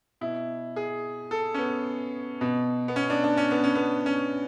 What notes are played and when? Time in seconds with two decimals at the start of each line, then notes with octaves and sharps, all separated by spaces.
0.21 B2 E4
0.76 G#4
1.31 A4
1.54 C#4
1.58 B3
2.41 B2
2.88 B3
2.96 C#4
3.10 D4
3.24 D4
3.37 C#4
3.51 B3
3.64 C#4
3.75 B3
4.06 C#4